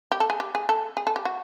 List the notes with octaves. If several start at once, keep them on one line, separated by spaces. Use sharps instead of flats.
G4
A4
G#4
G4
G#4
A4
G#4
A4
G4
F#4